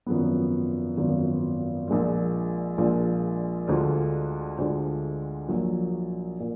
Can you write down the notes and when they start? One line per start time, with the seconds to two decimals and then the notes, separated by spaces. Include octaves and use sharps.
0.06 G#1 F#2 F3 B3
0.97 G#1 F#2 F3 B3
1.88 A#1 A#2 G#3 D4 F4
2.78 A#1 A#2 G#3 D4 F4
3.67 D2 D3 G#3 D4 F4
4.58 D2 D3 G#3 D4 F4
5.49 A#1 A#2 F#3
6.40 A#2